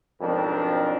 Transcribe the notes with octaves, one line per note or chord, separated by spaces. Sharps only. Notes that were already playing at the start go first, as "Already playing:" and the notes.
B1 F2 G#2 D4 A#4